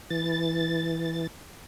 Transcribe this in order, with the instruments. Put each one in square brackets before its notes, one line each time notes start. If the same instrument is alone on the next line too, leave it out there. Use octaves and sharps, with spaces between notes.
[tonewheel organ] E3 A6